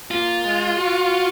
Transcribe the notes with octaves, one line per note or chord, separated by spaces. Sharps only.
A#3 F4
G#3
F#4